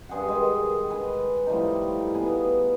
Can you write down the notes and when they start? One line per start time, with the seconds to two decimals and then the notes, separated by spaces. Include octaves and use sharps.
0.09 G2 G#4 C5 F#5
0.29 D#3 G#3
0.90 B4 G#5
1.47 A2 F3 G3 D#4
2.15 B3 G#4